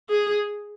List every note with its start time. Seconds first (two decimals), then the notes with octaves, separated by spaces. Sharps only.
0.09 G#4